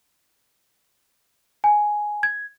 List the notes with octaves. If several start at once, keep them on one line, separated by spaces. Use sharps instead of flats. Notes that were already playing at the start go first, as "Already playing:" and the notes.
G#5
G#6